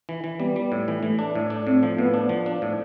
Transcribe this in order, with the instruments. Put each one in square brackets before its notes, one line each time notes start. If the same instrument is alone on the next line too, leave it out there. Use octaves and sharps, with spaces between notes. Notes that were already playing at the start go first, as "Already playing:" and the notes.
[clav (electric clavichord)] E3
E3
[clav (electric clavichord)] G3 [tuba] B3
[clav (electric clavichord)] G3
A2
E3
[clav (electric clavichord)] E3 [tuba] A3
[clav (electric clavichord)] D4
A2
D4
[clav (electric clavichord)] A2 [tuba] C4
[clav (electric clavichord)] F3
[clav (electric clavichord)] A2 [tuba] B3
[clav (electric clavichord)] D4
F3
D4
A2